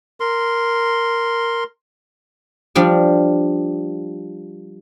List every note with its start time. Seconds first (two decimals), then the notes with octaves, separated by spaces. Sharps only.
0.20 A#4 C6
2.75 F3 G3 D4